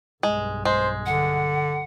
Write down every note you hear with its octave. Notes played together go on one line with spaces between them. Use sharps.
B1 G2 G#3
G#3 C5
D3 F#5